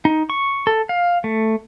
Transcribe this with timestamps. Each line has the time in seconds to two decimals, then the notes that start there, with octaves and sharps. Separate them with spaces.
0.05 D#4
0.30 C#6
0.67 A4
0.89 F5
1.24 A3